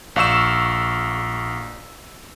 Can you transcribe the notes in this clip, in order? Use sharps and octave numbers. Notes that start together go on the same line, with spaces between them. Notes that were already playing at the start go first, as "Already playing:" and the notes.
A#1 F5 C#6 E6 E7